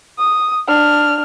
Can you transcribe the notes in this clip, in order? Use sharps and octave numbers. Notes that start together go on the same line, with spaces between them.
D#6
D4 F6